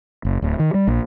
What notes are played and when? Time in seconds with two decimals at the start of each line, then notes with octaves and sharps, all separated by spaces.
0.25 F#1
0.42 D1
0.59 D#3
0.74 G3
0.87 A#1